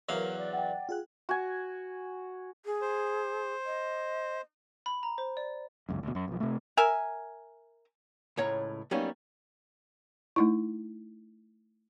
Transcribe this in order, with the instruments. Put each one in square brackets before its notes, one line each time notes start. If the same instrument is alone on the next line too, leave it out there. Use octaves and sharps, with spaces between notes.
[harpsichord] E2 F#3 F5 [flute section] A#4 [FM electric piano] E5 D6 F#6
[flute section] D5
[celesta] F#5 G5
[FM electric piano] F4 G#4 F#6
[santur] F#4 G#5
[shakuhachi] G#4
[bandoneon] C5
[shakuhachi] D#5
[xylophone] B5
A#5
C5
D5
[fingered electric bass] G1 C#2 F#2
D2 B2
F#2
B1 F3
C3 A3
[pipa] A#4 E5 G#5
[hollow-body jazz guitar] C#2 A2 C#5 A#5
F#3 G3 A#3 B3 C#4 D#4
[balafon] A3 D#4 E4